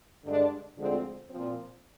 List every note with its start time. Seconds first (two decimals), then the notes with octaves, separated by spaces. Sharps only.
0.24 G2 D3 G#3 D4
0.76 D2 D3 F3 G#3 C4
1.30 A#2 F3 C4